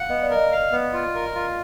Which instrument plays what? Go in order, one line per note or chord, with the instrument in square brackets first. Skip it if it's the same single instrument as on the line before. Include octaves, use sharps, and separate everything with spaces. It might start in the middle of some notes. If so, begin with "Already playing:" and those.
Already playing: [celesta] F5 [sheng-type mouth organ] F#5
[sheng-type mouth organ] B3 [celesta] D#5
[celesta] D5
[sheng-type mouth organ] A#4
[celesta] D#5
[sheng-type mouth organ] F5
B3
F4
A#4
F4